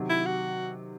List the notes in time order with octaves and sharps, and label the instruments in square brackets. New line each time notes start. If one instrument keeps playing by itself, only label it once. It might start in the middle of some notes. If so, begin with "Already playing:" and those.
Already playing: [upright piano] C3 D#3 F#3
[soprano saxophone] E4
F#4